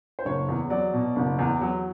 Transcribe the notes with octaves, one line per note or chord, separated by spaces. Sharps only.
C5
F#1 C#5
E2
F#3 D5
B2
F#1
E2
F#3